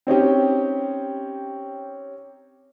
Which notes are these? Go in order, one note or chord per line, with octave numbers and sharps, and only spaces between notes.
C4 C#4 D#4 G4